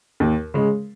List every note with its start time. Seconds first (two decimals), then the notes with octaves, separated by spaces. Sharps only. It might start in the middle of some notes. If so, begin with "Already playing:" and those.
0.20 D#2
0.54 C#3 G#3